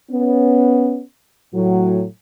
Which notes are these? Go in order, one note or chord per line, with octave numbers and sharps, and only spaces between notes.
B3 C#4
A2 F#3